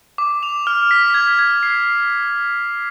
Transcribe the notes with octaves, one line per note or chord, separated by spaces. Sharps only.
D6
F7
F6
B6
G#6
G#6
C7